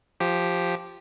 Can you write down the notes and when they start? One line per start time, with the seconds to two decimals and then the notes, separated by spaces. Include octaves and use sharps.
0.20 F3 G4